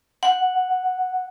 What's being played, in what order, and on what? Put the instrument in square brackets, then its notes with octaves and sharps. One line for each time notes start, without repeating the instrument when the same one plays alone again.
[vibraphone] F#5